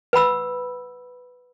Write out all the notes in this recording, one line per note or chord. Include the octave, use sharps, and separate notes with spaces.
B4 F#5 B5 E6